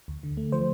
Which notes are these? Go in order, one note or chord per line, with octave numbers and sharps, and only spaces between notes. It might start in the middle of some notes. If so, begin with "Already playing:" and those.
D2
D3
A3
F3 C5